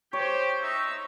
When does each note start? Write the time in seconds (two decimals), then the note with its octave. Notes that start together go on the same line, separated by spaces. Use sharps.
0.13 G4 C5 C#5 G5
0.62 D#4 E5